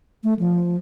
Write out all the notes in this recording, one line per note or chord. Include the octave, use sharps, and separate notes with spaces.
A3
F3